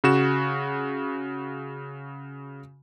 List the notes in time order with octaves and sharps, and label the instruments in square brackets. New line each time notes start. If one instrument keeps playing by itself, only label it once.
[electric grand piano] C#3 F#4 E7